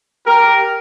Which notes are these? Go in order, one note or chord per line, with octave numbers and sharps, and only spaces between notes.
G4 A#4